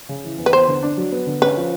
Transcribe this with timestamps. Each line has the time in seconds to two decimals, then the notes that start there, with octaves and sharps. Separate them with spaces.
0.09 C#3
0.24 E3
0.38 E2
0.46 B4
0.53 B3 C5
0.68 D3
0.83 D4
0.97 F#3
1.12 B3
1.27 D3
1.42 C#4 B4
1.56 F3